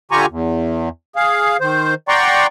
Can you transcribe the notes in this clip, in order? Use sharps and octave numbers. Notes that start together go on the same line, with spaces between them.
D3 F4 G4 G#5 A#5 C#6
E2
G#4 F5
D#3 C5
D5 F#5 G5 A#5 C6 C#6